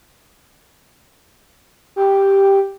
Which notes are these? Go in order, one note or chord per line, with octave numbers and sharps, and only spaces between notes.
G4